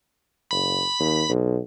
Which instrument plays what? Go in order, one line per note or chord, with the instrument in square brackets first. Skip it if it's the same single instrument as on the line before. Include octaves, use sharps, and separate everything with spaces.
[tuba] F#1 [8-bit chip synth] B5 B6
[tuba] D#2
B1